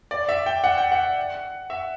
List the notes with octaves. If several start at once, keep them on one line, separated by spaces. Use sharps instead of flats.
D5
E5
G5
F#5
G5
F#5
E5